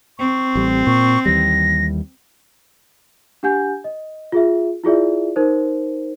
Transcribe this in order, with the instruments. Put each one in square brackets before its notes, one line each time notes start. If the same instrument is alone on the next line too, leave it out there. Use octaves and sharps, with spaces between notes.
[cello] C4 [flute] C#6
[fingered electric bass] A1 G3
[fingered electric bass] A#2 [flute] C#6
[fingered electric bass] D#2 E3 G3 [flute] A#6
[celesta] D4 G4 F#5 G#5 G6
D#5
F4 G#4 E5
E4 F4 G#4 D5 E5
D#4 A#4 C5